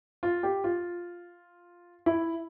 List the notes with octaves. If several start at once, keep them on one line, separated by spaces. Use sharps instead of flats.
F4
G4
F4
E4